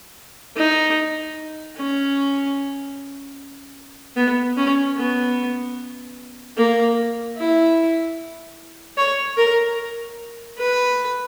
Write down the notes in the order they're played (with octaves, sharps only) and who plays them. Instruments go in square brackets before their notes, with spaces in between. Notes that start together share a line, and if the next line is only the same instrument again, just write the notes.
[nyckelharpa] D#4
C#4
B3
C#4
B3
A#3
E4
C#5
A#4
B4